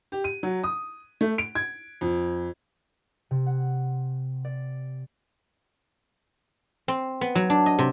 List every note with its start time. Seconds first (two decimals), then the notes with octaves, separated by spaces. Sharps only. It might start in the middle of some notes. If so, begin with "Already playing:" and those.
0.12 G4
0.24 D#7
0.43 F#3
0.64 D#6
1.21 A3
1.38 D7
1.55 G#6
2.01 F2
3.31 C3
3.46 F#5
4.45 D5
6.88 C4
7.21 B3
7.35 F#3
7.50 D4
7.66 D#5
7.79 C3